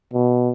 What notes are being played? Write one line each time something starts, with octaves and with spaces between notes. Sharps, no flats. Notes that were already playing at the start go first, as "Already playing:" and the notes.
B2